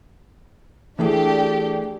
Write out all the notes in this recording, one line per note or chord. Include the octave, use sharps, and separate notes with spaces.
E3 A3 D4 G4 G#4